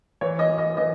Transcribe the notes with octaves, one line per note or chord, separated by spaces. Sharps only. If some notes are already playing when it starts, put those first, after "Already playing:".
E3 C#5
D#5
E3
D#5
E3 D#5